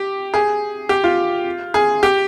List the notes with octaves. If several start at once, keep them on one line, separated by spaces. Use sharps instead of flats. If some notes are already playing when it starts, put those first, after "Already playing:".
Already playing: G4
G#4
G4
F4
G#4
G4